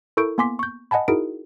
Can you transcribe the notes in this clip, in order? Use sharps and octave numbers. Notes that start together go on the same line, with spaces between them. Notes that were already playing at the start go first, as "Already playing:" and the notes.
E4 A4 A#4 C#6 G6 D7
A#3 B3 G#5 C6 D6 B6
C#6 G6
D#5 F#5 G#5 A5 B5
D#4 E4 F#4 G#4 A#4 D7